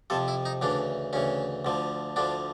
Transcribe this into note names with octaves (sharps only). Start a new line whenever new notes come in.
F2 C3 F3 A4
E4
D#4
D2 C#3 E3 D4
D2 C#3 E3 C#4
D2 D3 F3
D2 D3 F3 D4